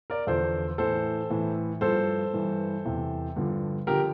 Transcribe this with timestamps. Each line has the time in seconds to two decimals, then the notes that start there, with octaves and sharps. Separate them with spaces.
0.10 A#4 D5
0.27 E2 D3 F3 A4 C5
0.78 A2 E3 A4 C5
1.30 A2 E3
1.81 G2 F3 A4 C5
2.33 G2 E3
2.85 E2 C3 E3
3.36 G2 D3 F3
3.87 D3 F3 G4 A#4